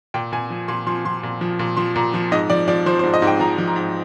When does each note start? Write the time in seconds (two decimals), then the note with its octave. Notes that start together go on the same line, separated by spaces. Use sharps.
0.14 A#2 G5
0.32 A#2 G#5
0.50 F3
0.68 A#2 C6
0.87 F3 C6
1.05 F3 C6
1.23 A#2
1.41 F3
1.59 A#2
1.77 F3 C6
1.96 A#2 A#5
2.14 F3
2.32 G#2 D#5
2.50 F3 D5
2.68 F3 D5
2.86 F3 C5
2.99 C5
3.04 G#2
3.14 D#5
3.22 G#2
3.27 G5
3.40 F3 A#5
3.58 F3
3.67 A#5
3.76 G#2